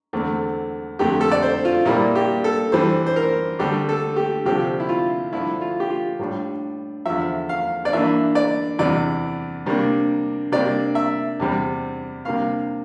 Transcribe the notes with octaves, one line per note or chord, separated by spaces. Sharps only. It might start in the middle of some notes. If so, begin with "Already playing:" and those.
E2 D3 A3 C4
F2 D3 A3 G4
A4
D5
C5
F4
A#2 G3 A#3 E4
G4
A4
G2 E3 G3 C5
C5
A#4
D2 D3 G3 D4 G4
A4
G4
D2 C3 F3 C4 G4
E4
F4
G2 D3 F3 E4
F4
G4
F4
A2 G3 D4
E2 D3 F3 E5
F5
D5
G2 E3 A#3 D4 E5
D5
E2 C3 E3 D5
C3 G3 A#3 D4
C3 G3 A#3 D4 D5
E5
E2 C3 G3 C4
C3 G3 A#3 D4 F5